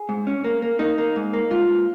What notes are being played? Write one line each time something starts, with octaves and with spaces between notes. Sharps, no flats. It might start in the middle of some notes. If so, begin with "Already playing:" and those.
Already playing: G#4
G#2
C#4
A#3
A#3
A#3 D#4
A#3
G#2
A#3
G#2 F4
G#2